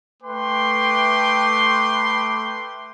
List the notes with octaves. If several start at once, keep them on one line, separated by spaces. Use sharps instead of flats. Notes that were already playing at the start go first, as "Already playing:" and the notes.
A3 B4 G5 C6 D6